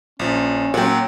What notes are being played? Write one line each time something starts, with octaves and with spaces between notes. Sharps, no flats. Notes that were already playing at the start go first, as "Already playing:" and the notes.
A#1 F3 C#4
A#2 F#3 F#5 G5